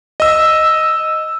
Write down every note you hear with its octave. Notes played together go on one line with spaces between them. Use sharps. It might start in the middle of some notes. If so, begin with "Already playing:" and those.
D#5 E6